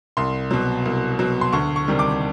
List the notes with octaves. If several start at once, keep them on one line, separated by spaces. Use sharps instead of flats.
C2 C6
B2 F#3
C2
B2 F#3
C6
D2 C#6
C#6
C3 D#3 G3
D6